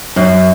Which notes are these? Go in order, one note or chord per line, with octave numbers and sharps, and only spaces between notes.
F#2